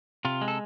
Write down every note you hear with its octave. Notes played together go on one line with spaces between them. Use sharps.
C3 F4
G#3
A4